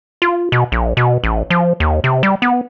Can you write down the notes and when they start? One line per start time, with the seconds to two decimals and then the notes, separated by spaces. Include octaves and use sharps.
0.22 F4
0.52 B2
0.72 A#1
0.97 B2
1.24 A1
1.50 F3
1.80 D#2
2.04 C3
2.23 G3
2.42 B3